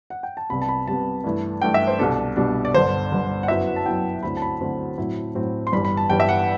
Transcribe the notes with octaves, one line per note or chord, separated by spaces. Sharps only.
F#5
G5
A5
C2 C3 G3 B3 B5
A5
B5
C2 C3 G3 B3 A5
G2 E3 A3 E4
G2 E3 A3 E4 G5
E5
C5
C2 B2 G3 D4 A4
C2 B2 G3 D4
D5
G1 G2 D3 C5
G1 G2 D3
F#5
F#2 F#3 B3 E4 E5
F#5
A5
F#2 F#3 B3 E4 G5
D2 D3 F#3 C4 E4 B5
A5
B5
D2 D3 F#3 C4 E4
A2 F#3 C4 E4
A2 F#3 C4 E4
C6
G1 G2 E3 G3 B5
B5
A5
G1 G2 E3 G3 G5
E5
F#5